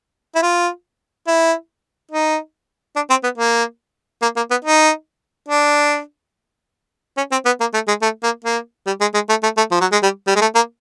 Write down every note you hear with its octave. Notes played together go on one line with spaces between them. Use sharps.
E4
F4
E4
D#4
D4
C4
B3
A#3
A#3
A#3
B3
D#4
D4
C#4
C4
B3
A#3
A3
G#3
A3
A#3
A#3
G3
G#3
G#3
A3
A3
A3
F3
F#3
G#3
G3
G3
G#3
A3
A#3